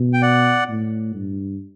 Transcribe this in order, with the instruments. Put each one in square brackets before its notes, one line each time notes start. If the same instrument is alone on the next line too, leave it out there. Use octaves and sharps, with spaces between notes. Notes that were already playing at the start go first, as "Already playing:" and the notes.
Already playing: [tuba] B2
[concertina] G5
D5 F#5
[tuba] A2
G2